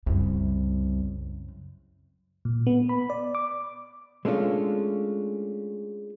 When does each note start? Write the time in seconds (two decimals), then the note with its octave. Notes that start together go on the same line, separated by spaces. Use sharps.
0.06 C2 F#2 C#3
2.45 A#2
2.67 B3
2.89 B5
3.10 D5
3.35 D6
4.25 G#3 A3 C#4 D4 F4